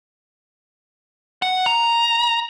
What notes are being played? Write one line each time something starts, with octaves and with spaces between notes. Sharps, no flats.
F#5
A#5